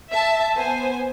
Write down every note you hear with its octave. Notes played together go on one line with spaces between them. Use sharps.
E5 A5
B3 C5 G#5